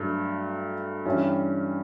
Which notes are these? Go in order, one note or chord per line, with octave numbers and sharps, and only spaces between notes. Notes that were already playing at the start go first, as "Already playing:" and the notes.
Already playing: G2 F#3 A3
G2 E3 G3 C#4 E4